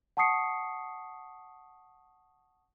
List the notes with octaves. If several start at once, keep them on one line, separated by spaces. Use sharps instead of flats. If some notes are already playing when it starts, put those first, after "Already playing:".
F#5 A5 C#6 D#6 C7 C#7